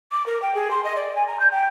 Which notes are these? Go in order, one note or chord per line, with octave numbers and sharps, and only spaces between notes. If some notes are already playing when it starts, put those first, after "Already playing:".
D6
A#4
G5
G#4
C6
D#5
D5
G#5
A#5
G6
G5